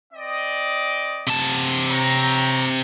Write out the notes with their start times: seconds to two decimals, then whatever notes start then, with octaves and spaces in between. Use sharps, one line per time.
0.14 C4 D5 D#5
1.27 C3 A5
1.89 C#5 G5 A#5